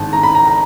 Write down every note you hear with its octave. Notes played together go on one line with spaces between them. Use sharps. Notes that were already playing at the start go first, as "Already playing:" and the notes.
Already playing: G#1 G#2 D#3 A5
A#5
B5
A#5
A#5